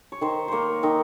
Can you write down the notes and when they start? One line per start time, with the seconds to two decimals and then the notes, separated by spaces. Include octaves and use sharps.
0.12 C#5
0.21 D#3 C5
0.48 A#3 C5 C#5
0.83 D#3 D#5